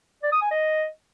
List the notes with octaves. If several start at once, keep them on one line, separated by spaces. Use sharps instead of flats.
D5
D#6
G#5
D#5